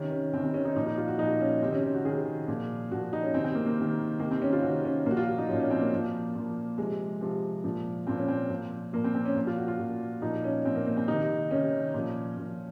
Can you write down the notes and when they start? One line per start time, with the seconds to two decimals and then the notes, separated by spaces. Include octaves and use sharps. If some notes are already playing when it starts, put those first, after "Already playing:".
Already playing: C3 D#3 C#4
0.11 C#4
0.33 C3 C4
0.37 D#3
0.44 C4
0.54 C#4
0.65 D#4
0.76 A#2 F3 D#4
0.87 D#4
0.98 F4
1.08 F#4
1.19 A#2 F3 D#4
1.40 C#4
1.62 C3 D#3 C4
1.73 C#4
1.83 C#4
1.95 F#4
2.05 C3 D#3 G#4
2.48 A#2 F3
2.91 A#2 F3 F#4
3.13 D#4
3.23 C#4
3.34 C3 D#3 C4
3.44 C4
3.55 A#3
3.66 A#3
3.78 C3 D#3
4.19 C3 D#3 A#3
4.31 C4
4.42 C#4
4.53 F4
4.63 C3 D#3 F#4
4.85 C#4
5.06 A#2 A#3
5.10 F3 F#4
5.17 F4
5.28 F#4
5.38 D#4
5.49 A#2 F3 C#4
5.60 C#4
5.71 C4
5.81 A#3
5.92 A#2 F3
6.35 A#2 F3
6.77 C3 F3 G#3
7.21 C3 F3
7.64 A#2 F3
8.07 A#2 F3 C4
8.18 C#4
8.28 C4
8.50 A#2 F3
8.93 A#2 F3 A#3
9.04 C4
9.15 C4
9.26 C#4
9.36 A#2 F3
9.47 F4
9.58 F#4
9.68 F4
9.79 A#2 F3
10.22 A#2 F3 D#4
10.44 C#4
10.65 A#2 F3 C4
10.75 A#3
10.87 A#3
10.97 C4
11.08 C3 D#3 D#4
11.51 C3 D#3 C#4
11.94 A#2 F3
12.37 A#2 F3